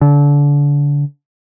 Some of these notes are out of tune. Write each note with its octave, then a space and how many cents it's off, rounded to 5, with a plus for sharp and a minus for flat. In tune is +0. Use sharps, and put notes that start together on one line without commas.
D3 -30